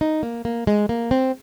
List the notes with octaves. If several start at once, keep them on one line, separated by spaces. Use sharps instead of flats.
D#4
A#3
A#3
G#3
A#3
C4